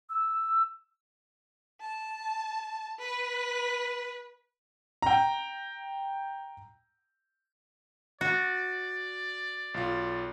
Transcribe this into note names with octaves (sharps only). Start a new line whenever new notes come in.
E6
A5
B4
G5 A#5
F#4 D5
B1 F4